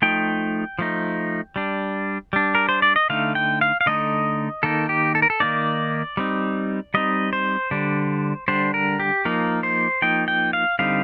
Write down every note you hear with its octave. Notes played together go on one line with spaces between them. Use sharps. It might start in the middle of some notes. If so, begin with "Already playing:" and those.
F3 A3 D#4 G5
F3 A3 D#4
G3 D4
G3 D4
A#4
C5
D5
D#5
D3 A3 D#4 F5
G5
F5
F5
D3 A3 D#4 D#5
D#3 A#3 D#4 A4
G4
A4
A#4
A4
D#3 A#3 D#4 D5
G3 C4 D#4
G3 C4 D#4 D#5
C5
D3 G3 D4
D3 G3 D4 C5
A#4
G4
F3 A#3 D#4 A#4
C5
F3 A#3 D#4 G5
G5
F5
D3 G3 C4 D#4 F5